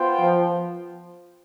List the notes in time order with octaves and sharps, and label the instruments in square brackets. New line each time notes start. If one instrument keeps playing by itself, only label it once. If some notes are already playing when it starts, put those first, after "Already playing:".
Already playing: [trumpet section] B3 F4 C5 G5
[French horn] F3